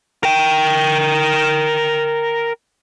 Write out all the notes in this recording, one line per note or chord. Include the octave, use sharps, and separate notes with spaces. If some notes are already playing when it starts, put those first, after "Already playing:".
A#4 G5